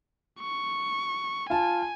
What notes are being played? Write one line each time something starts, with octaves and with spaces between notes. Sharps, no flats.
C#6
F4 G#5 A5